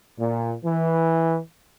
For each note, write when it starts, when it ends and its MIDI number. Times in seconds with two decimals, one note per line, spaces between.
0.18 0.53 46
0.64 1.38 52